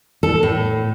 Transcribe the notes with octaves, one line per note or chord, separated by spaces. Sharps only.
A4
A2